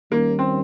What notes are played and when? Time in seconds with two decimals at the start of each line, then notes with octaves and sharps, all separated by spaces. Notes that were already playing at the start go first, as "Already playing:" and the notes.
0.11 D#2 D#3 G3 A#3 C#4
0.39 C4